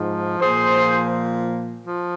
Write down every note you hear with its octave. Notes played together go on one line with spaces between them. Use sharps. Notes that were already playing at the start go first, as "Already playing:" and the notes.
Already playing: G#2 F3
A#2 F3 G#4 C5
F3